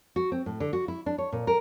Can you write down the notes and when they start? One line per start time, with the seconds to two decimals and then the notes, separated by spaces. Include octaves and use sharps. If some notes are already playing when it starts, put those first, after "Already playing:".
0.16 F#4
0.32 C4
0.46 A2
0.60 D3
0.73 F#4
0.88 E4
1.06 D4
1.18 C#5
1.32 A#2
1.47 A#4